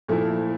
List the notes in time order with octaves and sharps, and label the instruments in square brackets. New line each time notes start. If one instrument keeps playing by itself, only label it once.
[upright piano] A#2 F3 A3 E4